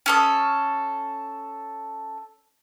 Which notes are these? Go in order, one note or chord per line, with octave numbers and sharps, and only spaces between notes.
C#4 A4 D#6